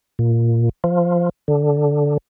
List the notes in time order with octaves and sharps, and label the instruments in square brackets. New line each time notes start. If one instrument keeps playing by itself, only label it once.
[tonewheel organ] A#2
F3
D3